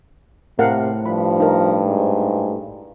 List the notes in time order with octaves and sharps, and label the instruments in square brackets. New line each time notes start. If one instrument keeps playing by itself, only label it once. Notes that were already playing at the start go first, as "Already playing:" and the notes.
[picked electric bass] A2 [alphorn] C3 [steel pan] A#4 F5 F#5
[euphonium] G2 [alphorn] F3 [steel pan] B5
[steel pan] D#4 A#4
[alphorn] G#2